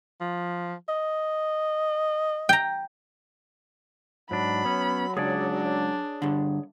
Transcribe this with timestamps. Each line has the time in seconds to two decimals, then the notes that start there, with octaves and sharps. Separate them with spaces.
0.20 F3
0.88 D#5
2.49 G5 A#5
4.31 G#2 F#3 D4 B5
4.65 B3 C#4
5.17 C#2 D4 G#4 C#5 D5
6.22 G2 D3